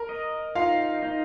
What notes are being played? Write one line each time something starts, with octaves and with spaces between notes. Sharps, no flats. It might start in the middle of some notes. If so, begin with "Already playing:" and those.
Already playing: A#4 A#5
D#5
D#4 F4 F5
D#4